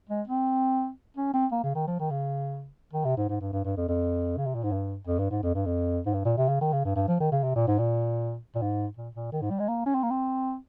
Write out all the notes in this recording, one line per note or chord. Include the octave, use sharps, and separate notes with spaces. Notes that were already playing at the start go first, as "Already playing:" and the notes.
G#3
C4
C#4
C4
A#3
C#3
D#3
F3
D#3
C#3
D#3
C3
G#2
G#2
G2
G2
G2
F2
F2
C#3
C3
A#2
G#2
G2
F2
G2
G#2
F2
G2
F2
G#2
G2
A#2
C3
C#3
D#3
C#3
G2
G2
F3
D#3
C#3
C3
A#2
G#2
A#2
A#2
G#2
A#2
A#2
D#3
G#2
G3
G#3
A#3
C#4
C4
A#3
C4